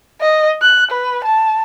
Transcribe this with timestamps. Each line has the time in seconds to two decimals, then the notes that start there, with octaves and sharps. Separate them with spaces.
0.21 D#5
0.62 F#6
0.91 B4
1.24 A5